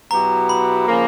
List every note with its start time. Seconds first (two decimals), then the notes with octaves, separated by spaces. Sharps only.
0.11 B2 F#3 B3 E4 G4 A#5
0.49 B5
0.88 C#3 F3 A#3